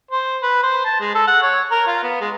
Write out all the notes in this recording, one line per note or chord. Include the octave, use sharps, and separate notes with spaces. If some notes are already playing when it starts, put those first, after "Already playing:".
C5
B4
C5
A5
G#3
A4
F#5
C#5
A#4
F4
B3
G#3